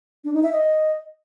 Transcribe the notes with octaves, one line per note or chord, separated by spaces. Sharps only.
D4
D#4
E5
D#5